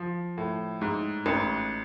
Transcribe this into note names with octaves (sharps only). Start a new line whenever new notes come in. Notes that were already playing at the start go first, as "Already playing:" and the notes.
Already playing: F3
A2
G#2
A1